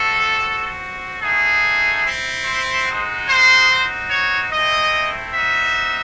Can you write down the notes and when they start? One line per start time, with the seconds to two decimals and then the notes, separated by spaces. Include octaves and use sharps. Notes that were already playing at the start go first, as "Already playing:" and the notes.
Already playing: A3 C4 F#4 A4
0.38 C4 F#4
1.21 A3 D#4 F#4 G#4
2.04 C4 E4
2.45 C5
2.86 G#3 D#4 F#4
3.28 C5
3.68 C4 D#4 F#4
4.10 C#5
4.51 A3 C4 E4 D#5
5.34 C4 D#4 F#4 E5